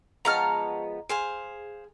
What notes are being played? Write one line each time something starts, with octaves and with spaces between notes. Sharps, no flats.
F3 G#3 B3 C#5 A5 A#5 F6
G#4 C5 F5 G#5